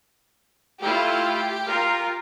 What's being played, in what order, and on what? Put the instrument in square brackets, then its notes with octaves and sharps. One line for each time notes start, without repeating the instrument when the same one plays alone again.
[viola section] A3 E4 F4 [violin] G4
[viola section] F4 A#4